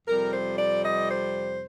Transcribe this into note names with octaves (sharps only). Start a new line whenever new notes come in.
F2 C3 G3 A#4
C5
D5
D#5
C5